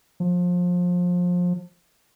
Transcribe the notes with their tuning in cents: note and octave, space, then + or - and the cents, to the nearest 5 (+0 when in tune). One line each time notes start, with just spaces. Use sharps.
F3 +25